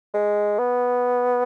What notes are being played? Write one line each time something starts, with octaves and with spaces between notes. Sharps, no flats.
G#3
B3